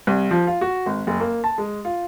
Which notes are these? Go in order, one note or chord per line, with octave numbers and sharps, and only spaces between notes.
C2
F3
F4
F#4
G#1
F#1
A#3
A5
G#3
F4